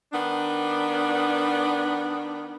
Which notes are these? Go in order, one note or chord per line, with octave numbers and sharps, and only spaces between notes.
D#3 B3 D4